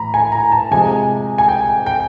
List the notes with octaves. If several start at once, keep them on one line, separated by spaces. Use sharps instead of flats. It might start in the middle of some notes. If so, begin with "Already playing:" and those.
Already playing: A2 E3 A#5 B5
G#5
A#5
A5
C3 F3 G#3 G#5
G#5
G5
G5